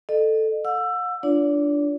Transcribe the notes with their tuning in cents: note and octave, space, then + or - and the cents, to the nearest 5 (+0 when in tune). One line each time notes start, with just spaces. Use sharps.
A4 +0 D#5 -35
F#5 -45 E6 +20
D4 +0 F4 -20 D5 -40